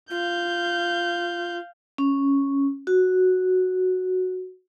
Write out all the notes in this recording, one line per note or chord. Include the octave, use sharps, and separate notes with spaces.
F4 F5 G6
C#4
F#4